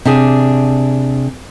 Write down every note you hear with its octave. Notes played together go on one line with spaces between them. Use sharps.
C3 D4 G#4